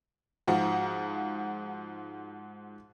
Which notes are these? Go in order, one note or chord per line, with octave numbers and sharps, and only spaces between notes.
G#2 F3 F#4